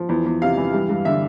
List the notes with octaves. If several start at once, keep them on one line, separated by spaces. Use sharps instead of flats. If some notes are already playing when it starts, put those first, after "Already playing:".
Already playing: F3
E2
E2
C3 F5
E3
G2
G2
D3 E5